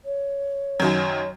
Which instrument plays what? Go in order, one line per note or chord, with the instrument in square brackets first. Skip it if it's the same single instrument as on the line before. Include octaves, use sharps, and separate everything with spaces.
[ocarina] C#5
[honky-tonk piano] F#2 D#3 F#3